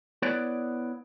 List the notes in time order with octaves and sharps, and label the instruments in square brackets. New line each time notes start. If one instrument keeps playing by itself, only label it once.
[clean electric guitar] B3 E4 B4 C#5 D5